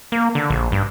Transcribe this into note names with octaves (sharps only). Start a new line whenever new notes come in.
A#3
D3
A#1
G2